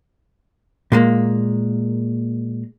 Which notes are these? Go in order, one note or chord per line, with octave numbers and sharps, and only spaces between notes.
A#2 G#3 A#3